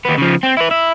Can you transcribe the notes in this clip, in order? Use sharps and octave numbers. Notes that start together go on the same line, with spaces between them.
D#2 B3
C#3 F3
C4
E4 B4
E4